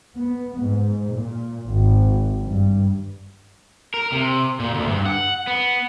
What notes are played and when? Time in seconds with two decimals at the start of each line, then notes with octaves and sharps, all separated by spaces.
0.16 B3
0.59 G#2
1.09 A#2
1.67 G#1
2.42 G2
3.94 A#4
4.12 C3
4.60 A#2
4.75 D2
4.88 G2
5.06 F#5
5.47 B3